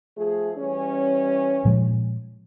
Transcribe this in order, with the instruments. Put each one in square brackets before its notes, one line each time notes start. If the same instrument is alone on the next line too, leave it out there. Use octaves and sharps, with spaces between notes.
[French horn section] F3 A3 G#4
E3 G3 C#4
[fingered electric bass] A#2 F3 G#3